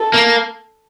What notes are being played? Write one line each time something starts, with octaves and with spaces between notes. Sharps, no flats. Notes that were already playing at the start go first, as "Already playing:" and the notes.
Already playing: A4
A#3